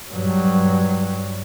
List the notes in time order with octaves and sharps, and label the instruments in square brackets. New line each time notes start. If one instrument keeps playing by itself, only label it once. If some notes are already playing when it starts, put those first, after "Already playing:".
[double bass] G2 F#3